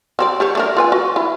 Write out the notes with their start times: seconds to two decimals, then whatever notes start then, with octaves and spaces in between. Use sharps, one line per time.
0.19 F#3 C4 D5
0.40 G4 C5 C#5
0.55 A3 D4 A#4
0.77 F4 B4 G#5
0.92 F#4
1.16 E4